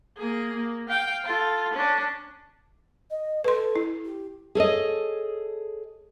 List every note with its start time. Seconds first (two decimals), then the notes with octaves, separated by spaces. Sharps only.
0.17 A#3 G#4
0.56 A#3
0.88 F5 G5
1.25 F4 A4
1.73 C#4 D4
3.10 D#5
3.44 A4 B4 C6
3.76 E4
4.05 G4
4.55 G#4 A4 C#5 D#5